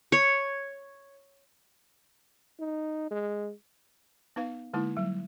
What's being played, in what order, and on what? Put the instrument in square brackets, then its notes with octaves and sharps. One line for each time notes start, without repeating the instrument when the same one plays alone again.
[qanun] C#5
[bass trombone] D#4
G#3
[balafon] B3 D#4 B4 F5
D3 G#3 A#3 D#4 E4
F#3 G3